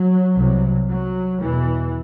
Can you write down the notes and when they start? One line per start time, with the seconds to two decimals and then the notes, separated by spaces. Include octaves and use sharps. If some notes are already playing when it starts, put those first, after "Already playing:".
Already playing: F#3
0.35 C2 C3
0.88 F#3
1.43 E2 B2 E3